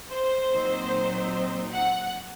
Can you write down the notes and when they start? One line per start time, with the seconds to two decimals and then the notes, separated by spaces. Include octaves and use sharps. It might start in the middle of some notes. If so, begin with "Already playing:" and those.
0.11 C5
0.51 A#2 F#3 C4 D#4
1.72 F#5